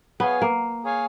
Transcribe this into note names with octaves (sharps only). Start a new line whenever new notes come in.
B3 G#4 C#5 F5 G#5
A#3
G#4 C#5 F5 G#5